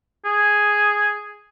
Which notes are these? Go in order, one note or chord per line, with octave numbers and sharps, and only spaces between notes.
G#4